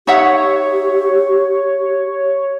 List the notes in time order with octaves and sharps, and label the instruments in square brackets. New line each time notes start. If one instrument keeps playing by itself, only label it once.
[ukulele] D#4 E5 F#5 [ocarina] G4 [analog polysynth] C#5